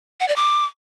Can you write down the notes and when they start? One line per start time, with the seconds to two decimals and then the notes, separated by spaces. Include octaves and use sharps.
0.20 F#5
0.28 D5
0.36 D6